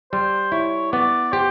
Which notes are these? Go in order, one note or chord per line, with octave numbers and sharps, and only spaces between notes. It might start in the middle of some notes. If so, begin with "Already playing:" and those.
G3 C5
E4 C#5
B3 D5
G4 C5